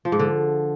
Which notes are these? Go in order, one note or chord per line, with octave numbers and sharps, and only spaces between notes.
F3
G#2
D3